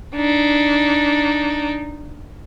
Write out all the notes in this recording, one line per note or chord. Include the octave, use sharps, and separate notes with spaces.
D4 D#4